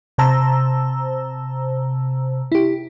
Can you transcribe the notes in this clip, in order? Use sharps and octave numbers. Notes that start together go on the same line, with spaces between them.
C3 C5 A5 A#5 E6
E4 G4